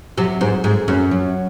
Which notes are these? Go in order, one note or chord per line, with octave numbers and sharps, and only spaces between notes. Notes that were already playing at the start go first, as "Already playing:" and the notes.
C3 F#3
G#2 C5
G#2 G#4
F#2 C#4
F#3